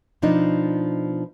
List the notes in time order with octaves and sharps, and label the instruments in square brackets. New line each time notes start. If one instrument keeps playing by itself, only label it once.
[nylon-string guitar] B2 F3 D4 D#4